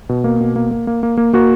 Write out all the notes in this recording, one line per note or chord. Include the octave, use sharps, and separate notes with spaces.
B2
A#3
B2
A#3
A#3
A#3
A#3
A#3
A#3 F#4